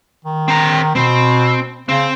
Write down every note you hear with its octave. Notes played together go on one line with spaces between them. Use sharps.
D#3
C4 A#5
B2 C4
C#3 C4